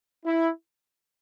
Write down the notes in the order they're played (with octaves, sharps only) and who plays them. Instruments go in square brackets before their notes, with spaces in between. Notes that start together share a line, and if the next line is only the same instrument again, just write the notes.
[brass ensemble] E4